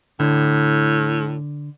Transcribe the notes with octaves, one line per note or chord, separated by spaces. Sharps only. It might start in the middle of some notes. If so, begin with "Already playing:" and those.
A2 D3